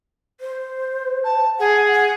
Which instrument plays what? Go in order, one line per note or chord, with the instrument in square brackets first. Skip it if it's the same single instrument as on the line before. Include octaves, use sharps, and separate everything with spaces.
[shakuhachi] C5
[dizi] A5
[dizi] G#4 [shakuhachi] F#5
[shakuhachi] F#5